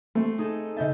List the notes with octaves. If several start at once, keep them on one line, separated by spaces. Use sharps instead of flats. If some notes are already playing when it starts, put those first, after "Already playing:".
A3 C4
D#4 G#4 A4
C#3 D#5 E5 G6 A6